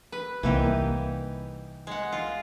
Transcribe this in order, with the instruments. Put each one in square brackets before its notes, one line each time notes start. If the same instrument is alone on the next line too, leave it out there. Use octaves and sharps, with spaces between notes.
[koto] B4
[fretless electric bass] C2 A#3 [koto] E3 D#4 G4
[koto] G#3 F#5
F4